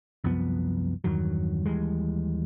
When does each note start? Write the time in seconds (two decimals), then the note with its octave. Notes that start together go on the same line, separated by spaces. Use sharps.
0.24 C2 F#2 F3 B3
1.04 E2 G2 D#3 F#3
1.66 D#2 E3 G3 G#3